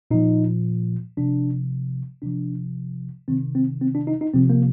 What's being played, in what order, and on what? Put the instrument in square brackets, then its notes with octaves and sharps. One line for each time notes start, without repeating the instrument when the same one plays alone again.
[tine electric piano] A#2 F3 D#4
C3 F3 D4
C3 F3 D4
C3 D#3 C4
C4
C4
D4
D#4
D#4
C3 F3 C4
A#3